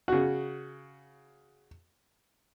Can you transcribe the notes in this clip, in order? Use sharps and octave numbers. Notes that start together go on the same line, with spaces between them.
C#3 F#4